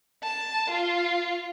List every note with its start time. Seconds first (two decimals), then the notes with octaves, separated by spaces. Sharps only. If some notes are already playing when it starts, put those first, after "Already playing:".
0.23 A5
0.71 F4